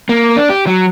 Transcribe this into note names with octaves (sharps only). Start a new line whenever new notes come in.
A#3
D4
G4
F#3